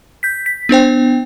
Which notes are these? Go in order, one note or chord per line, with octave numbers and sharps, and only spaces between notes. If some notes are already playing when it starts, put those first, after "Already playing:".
G6 B6
B6
B3 D4 C5 G5